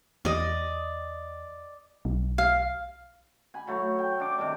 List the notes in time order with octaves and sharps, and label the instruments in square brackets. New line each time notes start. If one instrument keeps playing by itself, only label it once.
[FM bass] E2 [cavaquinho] D5 D#5
[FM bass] B1
[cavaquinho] F5
[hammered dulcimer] G#5 B5
F#3 A3 C#5
G5
D4 D6
C3 D#3 G3